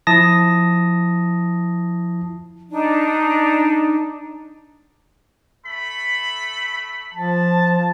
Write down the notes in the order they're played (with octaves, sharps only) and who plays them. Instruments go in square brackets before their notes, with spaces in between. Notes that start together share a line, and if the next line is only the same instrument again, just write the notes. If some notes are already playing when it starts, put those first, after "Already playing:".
[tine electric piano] F3 E4 A5 D#6 A#6
[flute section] D4 D#4
[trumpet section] A3 B5
[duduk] F3 [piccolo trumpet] A5